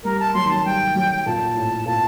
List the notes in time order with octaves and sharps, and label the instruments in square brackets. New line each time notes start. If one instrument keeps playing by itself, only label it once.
[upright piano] G3 [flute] A#4
[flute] A5
[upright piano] F#3 [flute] C6
[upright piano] D#3
[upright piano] F#3 [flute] A5
[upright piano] G3 [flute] G5
[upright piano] F#3
[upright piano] A#2 [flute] A5
[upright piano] A2
[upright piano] A#2 [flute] A5